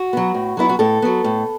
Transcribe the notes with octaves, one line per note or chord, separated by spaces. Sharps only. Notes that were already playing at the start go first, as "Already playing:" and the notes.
Already playing: F#4
F#3 B3
A2
F#3 B3 E4
F#4
A2 A4
F#3 B3
A2